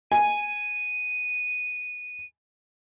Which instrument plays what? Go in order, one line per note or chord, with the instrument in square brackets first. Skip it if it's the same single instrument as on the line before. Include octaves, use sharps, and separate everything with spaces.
[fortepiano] G#5 [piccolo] D#7